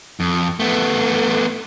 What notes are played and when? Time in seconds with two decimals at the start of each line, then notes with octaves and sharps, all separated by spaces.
0.20 F2
0.60 A3 B3